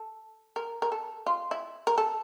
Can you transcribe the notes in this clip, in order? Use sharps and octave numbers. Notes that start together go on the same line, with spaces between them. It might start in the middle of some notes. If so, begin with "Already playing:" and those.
Already playing: A4
A#4
A#4
A4
F4
E4
A#4
A4